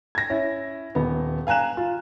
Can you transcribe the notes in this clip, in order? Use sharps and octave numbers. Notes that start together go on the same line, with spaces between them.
G#6 A#6
C#4 E4
D#1 B3
F5 G#5 A#5 F#6 E7
F4